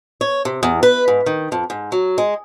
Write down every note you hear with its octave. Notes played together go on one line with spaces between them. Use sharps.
C#5
C3
E2
B4
G#2
D#3
F2
G#2
F#3
G#3